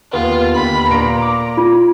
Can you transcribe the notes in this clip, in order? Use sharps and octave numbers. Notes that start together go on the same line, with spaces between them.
D#2 B3 F4
D#2 D3 B5
A#2 A#5 C6 D7
D6
F4